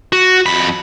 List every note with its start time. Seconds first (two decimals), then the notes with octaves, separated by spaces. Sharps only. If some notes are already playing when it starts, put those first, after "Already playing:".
0.13 F#4
0.46 F2 B5